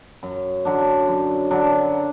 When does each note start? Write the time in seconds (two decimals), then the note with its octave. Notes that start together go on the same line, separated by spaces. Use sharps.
0.23 F#2
0.65 D3 F#3 D4
1.08 F#2
1.51 D3 F#3 D4